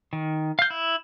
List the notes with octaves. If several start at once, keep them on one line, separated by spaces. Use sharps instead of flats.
D#3
F5 G6
E4